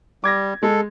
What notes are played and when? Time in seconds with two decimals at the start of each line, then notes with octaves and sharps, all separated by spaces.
0.24 G3 D6 G#6 A#6
0.63 G#3 A4